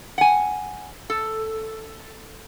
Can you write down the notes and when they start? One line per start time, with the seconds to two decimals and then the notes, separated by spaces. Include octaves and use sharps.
0.18 F#5 G#5
1.10 A4